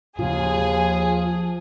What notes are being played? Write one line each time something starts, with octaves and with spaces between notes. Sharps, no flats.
D#2 A2 C#3 F3 F4 G#4
F3